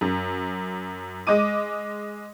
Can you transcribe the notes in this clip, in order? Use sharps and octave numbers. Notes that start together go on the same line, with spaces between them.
F#2
G#3 D#5 D6 D#7